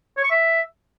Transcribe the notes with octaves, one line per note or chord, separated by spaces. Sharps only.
C#5
C#6
E5